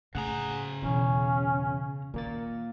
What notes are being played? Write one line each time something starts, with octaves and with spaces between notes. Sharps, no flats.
A2 C#3 G#4 F#5 A#5
E2 B2 E3 C#4
A#2 D#3 A#3 A6